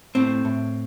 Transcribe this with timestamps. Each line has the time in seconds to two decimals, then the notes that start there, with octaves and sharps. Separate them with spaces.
0.15 A2 C4
0.45 A2